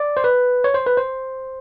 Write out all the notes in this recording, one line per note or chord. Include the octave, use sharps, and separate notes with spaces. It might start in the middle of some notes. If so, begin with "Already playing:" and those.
Already playing: D5
C5
B4
C#5
C5
B4
C5